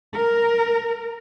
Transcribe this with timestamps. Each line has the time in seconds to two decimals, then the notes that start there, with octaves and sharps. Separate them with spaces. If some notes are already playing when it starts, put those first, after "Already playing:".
0.14 A#4